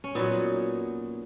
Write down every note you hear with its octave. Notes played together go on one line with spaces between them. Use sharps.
C#4
A#2 F#3 B3 D#4